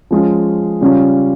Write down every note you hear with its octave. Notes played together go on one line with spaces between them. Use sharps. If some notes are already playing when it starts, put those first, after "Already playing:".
F3 G#3 C#4 F4
C#3 G3 C#4 F4